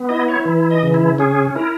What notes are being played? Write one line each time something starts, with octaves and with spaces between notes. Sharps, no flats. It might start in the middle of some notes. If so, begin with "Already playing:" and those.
Already playing: B3
E4 D#5
C#5
E3
D#5
C#3
E4
C#4 G#4
E4 A#4